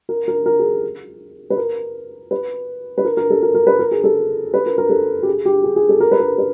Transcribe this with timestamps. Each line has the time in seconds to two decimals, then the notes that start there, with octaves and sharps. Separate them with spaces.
0.09 A#4
0.28 A#4
0.46 A#4
0.59 G#4
1.50 B4
1.57 A#4
2.31 B4
2.98 B4
3.05 A#4
3.17 A#4
3.30 A4
3.43 A#4
3.54 A#4
3.67 B4
3.79 A#4
3.91 G#4
4.04 A4
4.54 B4
4.66 A#4
4.78 A#4
4.90 A4
5.23 G4
5.26 G#4
5.45 G4
5.63 G#4
5.76 G#4
5.89 A4
6.00 A#4
6.11 B4
6.20 A#4
6.38 B4